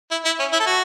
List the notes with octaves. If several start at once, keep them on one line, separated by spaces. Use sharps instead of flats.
E4
E4
C#4
E4
A4
F#4